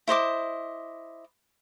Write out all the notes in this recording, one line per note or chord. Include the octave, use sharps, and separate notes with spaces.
E4 C5 D#5 D6